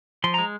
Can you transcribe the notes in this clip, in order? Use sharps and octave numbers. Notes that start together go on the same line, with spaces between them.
F3 C6
G#3 A#5